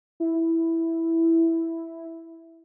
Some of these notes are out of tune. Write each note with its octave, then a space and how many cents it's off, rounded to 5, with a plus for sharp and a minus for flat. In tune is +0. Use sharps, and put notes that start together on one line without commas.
E4 +0